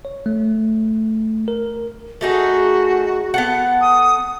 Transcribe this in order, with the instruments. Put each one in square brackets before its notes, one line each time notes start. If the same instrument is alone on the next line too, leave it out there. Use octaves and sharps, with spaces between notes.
[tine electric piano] C#5
A3
A#4
[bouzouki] A3 D#4 G#4 [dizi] F#4
[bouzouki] B3 A4 F#5
[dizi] D#6